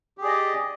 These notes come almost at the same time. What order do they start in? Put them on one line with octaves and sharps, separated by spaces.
G4 G#4 D5 D#5